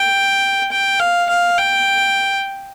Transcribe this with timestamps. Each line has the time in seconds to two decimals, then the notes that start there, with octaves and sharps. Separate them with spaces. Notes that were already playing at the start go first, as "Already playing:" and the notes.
Already playing: G5
0.71 G5
1.00 F5
1.29 F5
1.58 G5